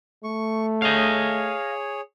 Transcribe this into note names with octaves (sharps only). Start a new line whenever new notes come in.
A3 C#6
G#4 C#5 D#5 F5